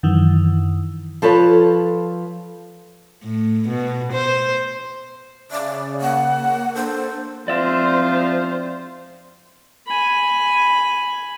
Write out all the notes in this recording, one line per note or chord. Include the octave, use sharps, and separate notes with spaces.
F#2 D#3 E3
F3 A4 B4 C#5
A2
B2
C5
C#3 D5 E5
A#3 F#5
D4 A4 C5
F3 C4 F4 C5 D5 E5
G#5 B5